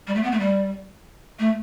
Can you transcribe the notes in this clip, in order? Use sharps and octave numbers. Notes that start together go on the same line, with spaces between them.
G3
A3
B3
A3
G3
A3